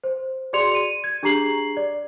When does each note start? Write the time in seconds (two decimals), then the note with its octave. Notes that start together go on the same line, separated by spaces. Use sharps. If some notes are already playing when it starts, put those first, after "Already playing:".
0.04 C5
0.53 F#4 G#4 D5 C6 C#7 F7
0.75 D#7
1.04 G#6
1.23 D4 G4 G#4 A#5 C7 F#7
1.77 D5